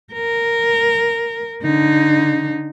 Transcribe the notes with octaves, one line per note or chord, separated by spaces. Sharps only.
A#4
D3 D#4